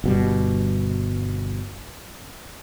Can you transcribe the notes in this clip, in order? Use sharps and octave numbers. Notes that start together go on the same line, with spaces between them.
G1 B2 G3